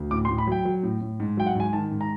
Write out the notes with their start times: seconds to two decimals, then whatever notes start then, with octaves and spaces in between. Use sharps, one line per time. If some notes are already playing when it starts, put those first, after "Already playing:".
Already playing: D2
0.11 A2 D6
0.25 C6
0.29 A2
0.38 B5
0.47 F#3 G5
0.65 F#3
0.83 A2
1.01 A2
1.20 G#2
1.37 F#3 G5
1.46 F#5
1.55 G#2 G#5
1.73 D#3 A5
1.91 G#2
2.01 A#5